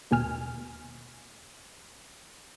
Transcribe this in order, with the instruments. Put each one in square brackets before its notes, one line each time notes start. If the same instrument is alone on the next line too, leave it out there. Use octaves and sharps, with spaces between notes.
[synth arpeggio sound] D#2 B2 G#5 F6